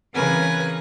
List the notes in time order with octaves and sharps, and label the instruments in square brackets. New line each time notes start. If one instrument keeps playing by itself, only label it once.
[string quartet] C#3 E3 C4 A#4 B4 G#5